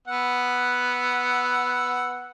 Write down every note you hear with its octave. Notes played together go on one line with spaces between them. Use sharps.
B3 F#5 E6